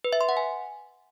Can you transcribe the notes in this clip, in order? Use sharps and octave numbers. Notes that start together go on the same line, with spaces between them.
B4
E5
C6
F#5
G#5